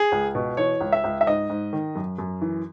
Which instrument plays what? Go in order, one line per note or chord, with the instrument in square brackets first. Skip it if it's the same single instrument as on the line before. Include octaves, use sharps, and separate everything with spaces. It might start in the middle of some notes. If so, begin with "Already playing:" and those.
Already playing: [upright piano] G#4
C#2
B2
E3 C#5
C#2
E5
C#2
E5
G#2 D#5
G#2
D#3
F#2
F#2
E3